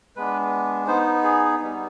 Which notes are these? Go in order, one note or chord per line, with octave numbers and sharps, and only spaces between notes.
G#3 B3 D4 B4
B3 D#4 C5
G#4
G3 B3 D#4